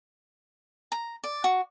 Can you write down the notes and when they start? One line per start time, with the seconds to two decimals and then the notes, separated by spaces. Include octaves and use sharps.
0.92 A#5
1.24 D5
1.44 F#4